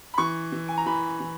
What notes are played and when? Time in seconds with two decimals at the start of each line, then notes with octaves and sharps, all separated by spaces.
0.14 B5
0.18 E3 C#6
0.52 E3
0.68 G#5
0.77 A#5
0.86 E3 B5
1.20 E3